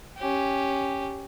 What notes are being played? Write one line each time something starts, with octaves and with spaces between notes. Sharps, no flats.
C#4 G4